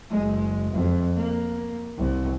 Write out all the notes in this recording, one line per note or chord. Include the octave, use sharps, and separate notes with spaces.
F#1 G#3
F2
A#3
C2